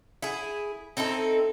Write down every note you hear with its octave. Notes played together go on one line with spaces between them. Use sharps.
E4 G#4
C4 D#4 E4 A4